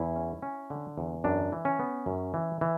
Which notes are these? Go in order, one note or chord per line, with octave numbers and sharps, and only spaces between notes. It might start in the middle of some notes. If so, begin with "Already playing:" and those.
Already playing: E2 E4
C#4
C#4
D3
E2
F#2 D4
E3
C#4
B3
F#2
E3
E3